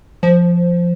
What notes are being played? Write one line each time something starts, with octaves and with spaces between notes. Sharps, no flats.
F3